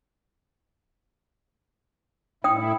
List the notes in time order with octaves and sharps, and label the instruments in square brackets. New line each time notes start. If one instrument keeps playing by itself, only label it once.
[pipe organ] A2 E4 [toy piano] G5 D#6